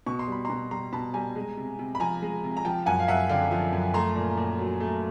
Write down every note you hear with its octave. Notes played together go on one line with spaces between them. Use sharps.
B2 C#6
C6
G3 B5
B2 A#5 C6
G3 A#5 C6
B2 A5 B5
G3 G#5 A#5
G#3
C3
C3
B5
F3 G#5 A#5
G#3
C3
A#5
F3 G5 A5
F#2 F#5 G#5
F5
F#2 E5 F#5
D3 F5 G5
F3
F#2
A3 A#5 C6
A#2
A#2
F#3
A3